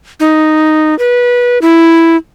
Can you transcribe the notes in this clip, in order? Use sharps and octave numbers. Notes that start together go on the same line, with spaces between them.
D#4
B4
E4